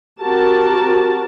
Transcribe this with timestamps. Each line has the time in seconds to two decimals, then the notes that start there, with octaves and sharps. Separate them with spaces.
0.20 C4 F#4 G4 A#4 A5